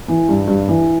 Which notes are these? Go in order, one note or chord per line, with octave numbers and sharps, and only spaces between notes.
E3
G2
G2
E3